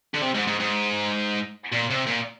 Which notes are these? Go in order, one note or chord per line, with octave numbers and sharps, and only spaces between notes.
D3
C3
G#2
G#2
G#2
A#2
C3
A#2